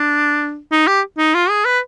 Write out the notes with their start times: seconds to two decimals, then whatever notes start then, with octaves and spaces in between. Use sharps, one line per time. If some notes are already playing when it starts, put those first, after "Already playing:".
Already playing: D4
0.72 D#4
0.87 G4
1.18 D#4
1.34 F4
1.50 G#4
1.65 B4